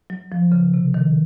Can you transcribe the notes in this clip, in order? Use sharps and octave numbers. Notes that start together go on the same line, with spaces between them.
F#3
F3
C#3
C3
D#3